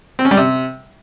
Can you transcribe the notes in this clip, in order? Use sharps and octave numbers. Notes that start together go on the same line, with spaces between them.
C4
C#4
G3
C3